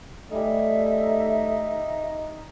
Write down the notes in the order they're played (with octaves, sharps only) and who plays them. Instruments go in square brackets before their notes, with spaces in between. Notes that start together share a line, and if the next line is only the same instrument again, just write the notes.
[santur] G3 G#5 [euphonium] A3 [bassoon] D#4 [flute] E5